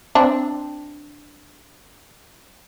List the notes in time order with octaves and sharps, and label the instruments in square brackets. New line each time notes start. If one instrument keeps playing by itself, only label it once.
[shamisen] C4 D4